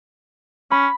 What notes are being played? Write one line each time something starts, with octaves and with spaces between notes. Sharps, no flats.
C#4 B5